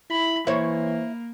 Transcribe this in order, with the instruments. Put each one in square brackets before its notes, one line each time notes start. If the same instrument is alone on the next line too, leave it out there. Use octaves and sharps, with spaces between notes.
[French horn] E4 [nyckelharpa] B5
[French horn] E3 [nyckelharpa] A#3 [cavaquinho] E4 [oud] C5 C#5